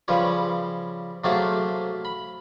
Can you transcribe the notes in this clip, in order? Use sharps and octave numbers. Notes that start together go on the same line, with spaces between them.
C#3 F3 G3 B4 C#5
C3 F#3 A3 A#3 G#4 A4
B5